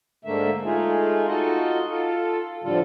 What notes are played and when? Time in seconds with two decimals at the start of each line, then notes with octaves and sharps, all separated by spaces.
0.25 G#2 D3 A3 A#3 E5
0.65 G#3 A3 D#4 F4 G#4
1.28 D#4 F4 F#4 A4 D#5
1.90 F4 A4
2.64 F2 A2 D3 G3 F4 A4